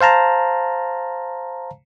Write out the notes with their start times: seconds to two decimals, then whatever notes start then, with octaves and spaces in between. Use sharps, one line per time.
0.01 C5 F5 A5 A#5